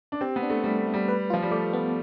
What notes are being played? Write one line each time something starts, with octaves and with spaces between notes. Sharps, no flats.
D4
C4 G4
B3
D4
A3
G3 A3
A3
G3
B4
F3 F4
G3
A3 D5
B3